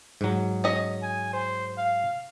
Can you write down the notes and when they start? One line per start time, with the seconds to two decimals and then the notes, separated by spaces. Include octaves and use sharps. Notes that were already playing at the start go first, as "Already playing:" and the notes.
0.21 G#2 F#3
0.64 C#4 D#5
1.02 G#5
1.33 C5
1.78 F5